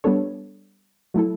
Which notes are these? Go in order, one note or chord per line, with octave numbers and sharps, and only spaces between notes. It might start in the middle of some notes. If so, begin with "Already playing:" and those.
G3 B3 D4 A4 C#5
F#3 A3 E4 A4